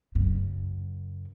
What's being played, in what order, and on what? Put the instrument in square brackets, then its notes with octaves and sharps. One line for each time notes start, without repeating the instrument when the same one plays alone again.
[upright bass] F#2 C#3